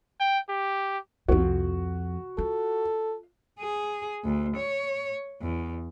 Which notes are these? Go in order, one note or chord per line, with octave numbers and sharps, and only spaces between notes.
G5
G4
C2 F2 F3 F#4
F4 A4
G#4
D2
C#5
E2